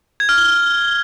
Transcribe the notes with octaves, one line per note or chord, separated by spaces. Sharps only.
G#6
F6
G7